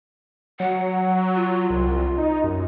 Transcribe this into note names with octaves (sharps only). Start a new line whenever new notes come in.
F#3 F#5
F4
C2
D#4
F#2